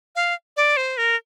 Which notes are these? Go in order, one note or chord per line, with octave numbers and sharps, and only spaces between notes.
F5
D5
C5
A#4